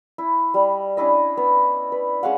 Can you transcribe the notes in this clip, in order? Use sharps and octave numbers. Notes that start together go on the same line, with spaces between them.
E4
G3 D#5
C#4 D4 E4 D#5
B3
B4
G#3 C#4 F5 F#5